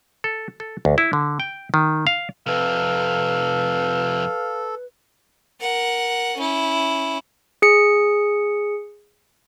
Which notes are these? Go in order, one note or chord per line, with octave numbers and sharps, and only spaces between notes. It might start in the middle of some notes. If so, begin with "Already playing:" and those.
A4
A4
D2
E4
D3
G5
D#3
F5
F2 C3 A4 B4 F5
A#4 F#5
C#4 E4
G#4 C#7